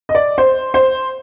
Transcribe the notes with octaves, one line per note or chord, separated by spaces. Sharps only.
D#5
D5
C5
C5